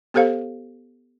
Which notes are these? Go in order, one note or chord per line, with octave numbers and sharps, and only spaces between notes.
B3 G4 A4 C5 F5